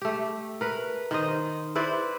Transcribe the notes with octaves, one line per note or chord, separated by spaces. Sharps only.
A3 G4
A#4 B4
D#3 C5 D#5
E4 B4 C5 D5